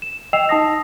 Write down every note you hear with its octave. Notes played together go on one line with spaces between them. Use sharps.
E7
D#5 G5 E6 C7 E7 F7
D#4 A5 D#6 A#6